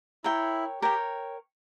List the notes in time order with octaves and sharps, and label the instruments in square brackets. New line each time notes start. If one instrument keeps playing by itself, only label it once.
[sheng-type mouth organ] E4 [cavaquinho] A#4 C#5 G5
[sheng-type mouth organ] G4 [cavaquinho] A#4 C#5 G5